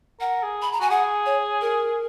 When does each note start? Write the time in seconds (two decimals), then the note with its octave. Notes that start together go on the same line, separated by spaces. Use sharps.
0.20 A#4 F#5
0.43 G#4
0.62 B5
0.72 A#5
0.80 F#4 G#5
0.90 G#4 F#5
1.26 C#5
1.61 A#4